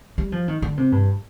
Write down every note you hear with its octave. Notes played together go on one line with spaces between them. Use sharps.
G3
F3
D#3
D3
C3
G2